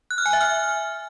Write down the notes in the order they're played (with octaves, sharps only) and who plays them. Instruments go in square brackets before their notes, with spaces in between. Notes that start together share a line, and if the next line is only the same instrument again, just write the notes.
[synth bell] F#6
F6
G#5
E5
F6